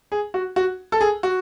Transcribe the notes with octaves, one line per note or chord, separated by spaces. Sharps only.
G#4
F#4
F#4
A4
G#4
F#4